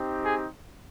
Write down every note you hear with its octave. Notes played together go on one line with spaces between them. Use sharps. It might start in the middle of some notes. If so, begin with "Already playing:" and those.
Already playing: C4 D#4 G4
G#4